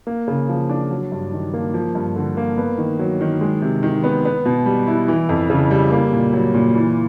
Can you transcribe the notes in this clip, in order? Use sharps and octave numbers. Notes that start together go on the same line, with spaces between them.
A#3
C#3
F3
D4
F#3
G2
D#3
A#3
F3
G2
D3
A#3
B3
D#3
F#3
D#3
G#3
C3
D#3
B3
B3
B2
G3
E4
E3
F2
C#3
G3
A#3
A#2
F#3
A#2
E3